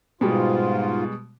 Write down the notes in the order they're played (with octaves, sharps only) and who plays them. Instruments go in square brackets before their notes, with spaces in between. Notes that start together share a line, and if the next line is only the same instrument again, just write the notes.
[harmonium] G#2 F4 [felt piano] B2 G3 G#3